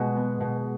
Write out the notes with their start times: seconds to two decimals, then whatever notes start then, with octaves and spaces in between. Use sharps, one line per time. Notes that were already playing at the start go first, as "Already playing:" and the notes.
Already playing: B2 G#3 F#4
0.16 B3
0.40 B2